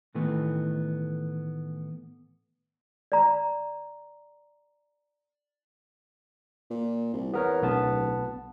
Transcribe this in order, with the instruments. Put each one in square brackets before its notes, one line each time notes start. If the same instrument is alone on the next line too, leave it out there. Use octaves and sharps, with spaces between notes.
[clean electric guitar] A2 D#3 E3 A3 B3
[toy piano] D5 A#5
[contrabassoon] A#2
C2
[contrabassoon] E2 [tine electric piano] B3 A#4 C#5
[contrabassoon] D1 [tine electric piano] B1 B3 A5